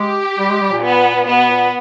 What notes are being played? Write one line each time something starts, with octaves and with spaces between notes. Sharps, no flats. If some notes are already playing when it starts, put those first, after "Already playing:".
Already playing: G#3 G4
G3
G#3
G3
A#2
B3
A#2
B2 B3
A#2